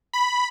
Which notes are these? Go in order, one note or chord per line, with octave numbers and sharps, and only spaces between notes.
B5